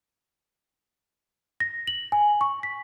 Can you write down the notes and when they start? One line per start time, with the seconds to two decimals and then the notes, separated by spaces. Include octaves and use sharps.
1.60 A#6
1.87 F#7
2.12 G#5
2.41 C#6
2.63 B6